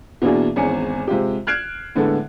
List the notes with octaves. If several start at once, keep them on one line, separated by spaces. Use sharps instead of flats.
B2 E3 A#3 D4 F#4 G#4
G#1 E2 C#4 G#5 C#7
C3 G#3 F4 G4
F6 F#6 G#6 C7 D7 E7
A2 D3 G#3 B3 A4